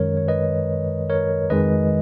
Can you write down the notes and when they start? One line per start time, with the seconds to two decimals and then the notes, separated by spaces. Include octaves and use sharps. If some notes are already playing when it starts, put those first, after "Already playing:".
Already playing: F#2 D#3 G#3 A#4 C#5
0.17 C#5
0.28 B4 D#5
1.10 A#4 C#5
1.50 F2 D#3 G#3 B4 D#5